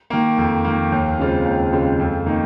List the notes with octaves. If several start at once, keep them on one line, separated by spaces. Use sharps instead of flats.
D#3 A#3
F2
D#3 A#3
D#2
C#3 G#3 C4 F4
D#2
C#3 G#3 C4 F4
F2
D#3 A#3 D#4